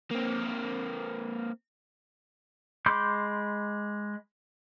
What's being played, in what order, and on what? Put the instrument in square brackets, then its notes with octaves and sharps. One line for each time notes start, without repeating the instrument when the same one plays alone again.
[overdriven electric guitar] A#3 C4
[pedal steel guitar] G#3 B5 C6 D6 G6